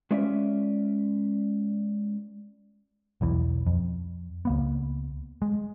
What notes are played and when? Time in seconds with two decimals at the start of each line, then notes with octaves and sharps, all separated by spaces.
0.11 G#3 C#4 F4 B4 D5 E5
3.21 B1 E2 E3
3.67 F2
4.45 C#2 A#3 B3
5.42 G#3